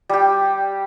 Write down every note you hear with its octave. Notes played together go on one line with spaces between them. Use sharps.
G3 G4